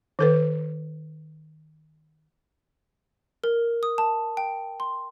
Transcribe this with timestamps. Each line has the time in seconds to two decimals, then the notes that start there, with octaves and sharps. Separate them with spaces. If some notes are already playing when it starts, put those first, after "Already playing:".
0.19 D#3 A4 B4
3.44 A#4
3.83 D#6
3.98 A5
4.37 G5
4.80 C6